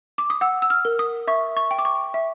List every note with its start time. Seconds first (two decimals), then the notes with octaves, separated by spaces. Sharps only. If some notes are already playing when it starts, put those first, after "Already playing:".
0.18 D6
0.30 D#6
0.41 F#5 E6
0.62 E6
0.70 F6
0.85 A#4
0.99 D#6
1.27 E5 C#6
1.57 C#6
1.71 G5
1.79 D6
1.85 C#6
2.14 E5